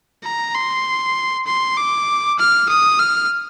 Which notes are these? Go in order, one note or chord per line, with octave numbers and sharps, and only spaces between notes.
A#5
C6
C6
D6
F6
D#6
F6